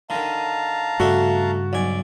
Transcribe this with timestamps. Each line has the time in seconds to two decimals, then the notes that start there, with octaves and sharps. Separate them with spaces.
0.10 D3 D#3 F5 A5 A#5
1.00 G2 C#3 A3 D4 F#4 A4
1.73 B1 D5 G#5